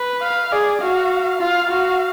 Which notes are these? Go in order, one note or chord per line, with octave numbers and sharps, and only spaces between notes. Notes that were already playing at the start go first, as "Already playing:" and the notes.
Already playing: B4
F5
G#4 D5
F#4 F5
F4 F5
F#4 F5